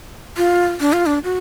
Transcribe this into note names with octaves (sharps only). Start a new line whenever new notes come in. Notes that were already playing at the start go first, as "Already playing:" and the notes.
F4
D4
F4
D4
F#4